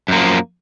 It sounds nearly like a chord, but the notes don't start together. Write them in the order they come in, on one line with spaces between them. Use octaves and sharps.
F#2 A#3 F3